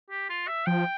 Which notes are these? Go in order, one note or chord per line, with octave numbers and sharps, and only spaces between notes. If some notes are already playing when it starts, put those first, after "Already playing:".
G4
F4
E5
F3 G5